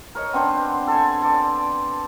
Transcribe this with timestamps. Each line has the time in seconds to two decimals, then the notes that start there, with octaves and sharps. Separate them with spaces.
0.15 A#4 C#5 D#5
0.33 B3 C4 D4 C5
0.87 A4 G#5
1.22 A4 D5